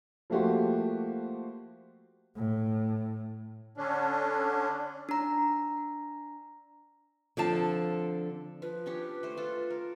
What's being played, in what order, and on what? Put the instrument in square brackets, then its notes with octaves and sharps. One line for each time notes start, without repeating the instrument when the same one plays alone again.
[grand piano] F3 A3 A#3 F#4 G4 C5
[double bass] A2
[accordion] D3 C#4 D4
[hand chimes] D4 A#5
[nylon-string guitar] D3 F3 C4 F5 A5
[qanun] F3 [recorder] B4
[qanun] C#4 D4 G4
A3 C5
F4 A4
A#4